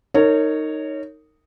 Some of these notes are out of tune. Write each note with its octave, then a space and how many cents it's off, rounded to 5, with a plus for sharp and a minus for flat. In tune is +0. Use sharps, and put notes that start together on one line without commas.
D#4 +0 A#4 -30 C#5 +0